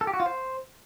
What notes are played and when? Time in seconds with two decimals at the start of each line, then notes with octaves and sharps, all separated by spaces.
0.01 A4
0.07 G4
0.14 F#4
0.20 F4
0.26 C5